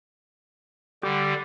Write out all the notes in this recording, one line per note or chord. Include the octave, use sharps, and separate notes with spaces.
D3 G3 G4 D6